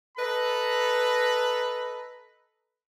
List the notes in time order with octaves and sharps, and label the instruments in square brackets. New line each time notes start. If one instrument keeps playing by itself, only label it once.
[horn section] A4 B4 D#5 A#5 B5